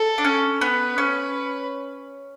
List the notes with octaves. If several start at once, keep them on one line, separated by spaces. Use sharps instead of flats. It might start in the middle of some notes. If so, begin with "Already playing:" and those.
Already playing: A4
D4
C#4
B3 B4
C#4